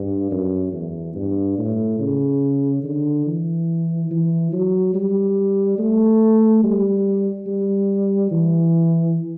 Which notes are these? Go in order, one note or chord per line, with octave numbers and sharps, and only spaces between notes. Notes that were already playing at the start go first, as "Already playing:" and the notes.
Already playing: G2
F#2
E2
G2
A2
C#3
D3
E3
E3
F#3
G3
A3
G3
G3
E3